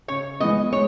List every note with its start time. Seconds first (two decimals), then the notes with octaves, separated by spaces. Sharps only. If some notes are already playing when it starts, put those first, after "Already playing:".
0.08 C#3 C#5
0.40 E3 G#3 B3 D#5
0.72 G#3 C#5